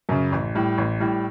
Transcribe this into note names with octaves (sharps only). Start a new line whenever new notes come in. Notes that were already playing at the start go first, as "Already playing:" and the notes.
F#2 C#3
A1
A2 G3
A1
A2 G3